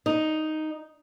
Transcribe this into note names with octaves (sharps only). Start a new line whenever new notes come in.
D#4